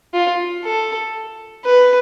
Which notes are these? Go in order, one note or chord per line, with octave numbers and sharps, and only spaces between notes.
F4
A4
B4